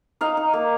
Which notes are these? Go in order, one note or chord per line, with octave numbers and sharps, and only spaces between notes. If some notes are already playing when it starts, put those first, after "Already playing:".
D#4 F5
D#4
A#3